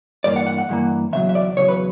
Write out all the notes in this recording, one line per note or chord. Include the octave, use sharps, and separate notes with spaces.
G2 E3 A#3 D5
F#5
F#5
F#5
G2 E3 A#3
E2 C#3 F#3 E5
E5
D5
E2 C#3 F#3 C#5
B4